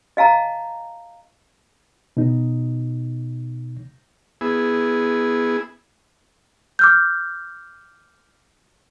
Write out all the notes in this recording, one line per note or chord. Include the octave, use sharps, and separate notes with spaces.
D#5 F5 A5 A#5
B2 D#4
B3 E4 G#4
D6 F6 G6